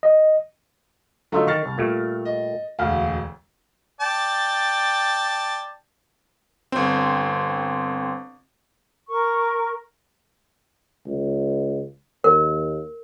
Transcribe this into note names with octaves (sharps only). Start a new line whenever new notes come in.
D#5
D3 F#3 A3 D#4 F4 A4
D#3 C#6 F6 A6
C2
A#2 G3 A3
D#5
E1 D2 F5
D5 G5 A5
G1 C4
A#4 C#6
C#2
D#2 A#4